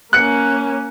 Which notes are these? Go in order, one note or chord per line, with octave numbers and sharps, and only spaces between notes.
A#3 C#4 F#6 C#7